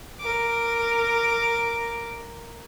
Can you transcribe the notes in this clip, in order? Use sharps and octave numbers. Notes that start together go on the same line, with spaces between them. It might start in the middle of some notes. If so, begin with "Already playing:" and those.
A#4 D6